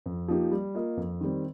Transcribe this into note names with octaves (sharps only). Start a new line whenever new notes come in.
F2
F3 A#3 D#4 G4
G3
A#3 F4 A#4 D#5
F2
D#3 G3 C4